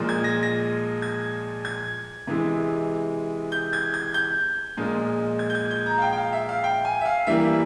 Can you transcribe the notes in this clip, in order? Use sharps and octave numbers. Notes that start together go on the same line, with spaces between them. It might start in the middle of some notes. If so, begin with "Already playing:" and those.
Already playing: A#2 F3 G#3
G#6
A#6
A#6
G#6
G#6
C3 E3 G#3
G6
G#6
G#6
G6
A#2 F3 G#3
G#6
G6
G#6
G6
A#5
F5
G5
G5
F5
E5
F5
G5
G#5
E5
F5
E3 G3 A#3 E5